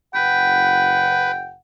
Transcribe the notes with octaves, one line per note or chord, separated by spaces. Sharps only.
F#1 B4 F#5 G5